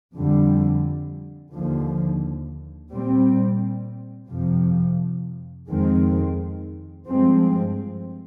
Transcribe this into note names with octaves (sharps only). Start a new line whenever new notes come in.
F2 D3 G3
D#2 D3 F3
A#2 G3 C4
F2 C3 F3
F2 D#3 G#3 C4
G2 F3 G#3 C4